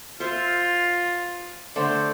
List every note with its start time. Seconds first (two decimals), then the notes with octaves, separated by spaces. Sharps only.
0.20 F4 C5 E5
1.76 D3 A3 C5 D5